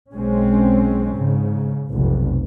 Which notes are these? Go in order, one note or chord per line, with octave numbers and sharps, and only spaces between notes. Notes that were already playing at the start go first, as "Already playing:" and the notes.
B1 G#3 C4 C#4
G#2 C#3
F1 B1